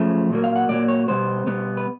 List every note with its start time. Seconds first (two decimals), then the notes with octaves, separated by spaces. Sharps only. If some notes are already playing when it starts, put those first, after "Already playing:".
Already playing: F#2 C#3 F3 A3
0.30 A#2 F#3 A#3
0.44 F5
0.56 F#5
0.69 A#2 F#3 A#3 D5
0.88 C#5
1.08 B2 G3 B3 C5
1.46 B2 G3 B3
1.77 B4